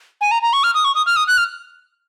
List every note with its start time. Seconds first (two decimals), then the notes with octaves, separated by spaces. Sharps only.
0.21 G#5
0.31 A#5
0.42 A#5
0.53 C#6
0.64 F6
0.75 D#6
0.85 C#6
0.95 D#6
1.06 F6
1.16 D#6
1.27 F#6
1.37 F6